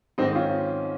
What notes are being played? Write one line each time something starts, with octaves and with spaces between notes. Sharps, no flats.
G#2 D#3 C4 D#4
C#4 F4